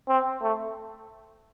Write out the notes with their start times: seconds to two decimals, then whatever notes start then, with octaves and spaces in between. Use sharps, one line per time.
0.08 C4
0.42 A3